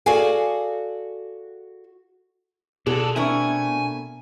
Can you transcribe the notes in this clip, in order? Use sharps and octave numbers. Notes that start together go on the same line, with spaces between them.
F#4 G#4 A4 D5 F5 G#5
B2 G#4 A4 D5 F#5 A5
A3 C4 D4 E4 A#4 G#5 C#6